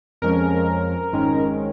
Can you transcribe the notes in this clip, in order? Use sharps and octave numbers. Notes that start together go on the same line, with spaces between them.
F2 F3 G#3 C#4 A#4
G#1 G#2 D#3 G#3 C#4